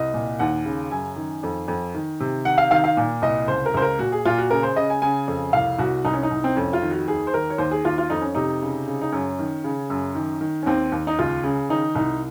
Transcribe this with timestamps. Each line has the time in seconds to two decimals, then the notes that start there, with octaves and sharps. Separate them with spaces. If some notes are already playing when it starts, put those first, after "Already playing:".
Already playing: C2 D#5
0.14 A#2
0.39 D#2 F#5
0.65 C#3
0.91 F#2 G#5
1.16 D#3
1.43 F2
1.68 F2
1.95 D#3
2.20 C3
2.45 D#3 F#5
2.58 F5
2.71 D#3 F5
2.84 F5
2.97 A#2
3.22 C2 D#5
3.47 C#2 C5
3.66 A#4
3.74 C#2 C5
3.82 A#4
3.99 A#2 F#4
4.12 G#4
4.25 A#2 F4
4.38 F#4
4.50 C#3 A#4
4.63 C5
4.76 C#3 D#5
4.90 G#5
5.02 C#3 G#5
5.28 F2
5.53 C2 F5
5.79 C2 F#4
6.05 C2 D#4
6.14 C#4
6.23 D#4
6.31 C2
6.44 C4
6.56 F2 C#4
6.73 F4
6.82 D#3
6.90 F#4
7.07 D#2 G#4
7.27 C5
7.34 D#3 A#4
7.50 C#5
7.58 D#2 C5
7.71 G#4
7.85 D#2 F4
7.98 F4
8.10 F2 D#4
8.21 C#4
8.35 C3 D#4
8.62 C#3
8.88 C#3
9.02 D#4
9.12 F#2 C#4
9.39 D#3
9.64 C#3
9.90 F#2
10.15 D#3
10.41 D#3
10.63 C#4
10.66 D#2 C4
10.92 D#2
11.07 D#4
11.19 C#2 F4
11.44 C#3
11.69 D#3 D#4
11.95 C2 D#4